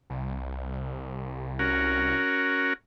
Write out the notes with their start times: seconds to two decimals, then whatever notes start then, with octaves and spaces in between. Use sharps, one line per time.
0.10 C2
1.59 C#4 F#4 A#4